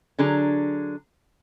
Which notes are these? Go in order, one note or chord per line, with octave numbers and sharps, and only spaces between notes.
D3 F#3 D4 G#4 A#5